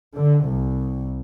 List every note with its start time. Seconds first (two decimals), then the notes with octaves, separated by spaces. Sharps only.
0.16 D3
0.47 C2